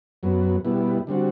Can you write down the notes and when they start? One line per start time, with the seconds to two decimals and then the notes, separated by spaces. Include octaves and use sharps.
0.23 F#2 F#3 B3
0.65 B2 G3 B3 E4
1.07 D3 G3 C4 F#4